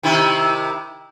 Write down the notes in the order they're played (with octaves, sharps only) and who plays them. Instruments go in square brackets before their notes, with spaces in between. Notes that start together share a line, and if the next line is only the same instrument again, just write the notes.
[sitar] C3 D#3 E4